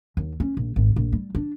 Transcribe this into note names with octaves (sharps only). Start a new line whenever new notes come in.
D#2
C#4
A#1
G#1
A#1
G3
D4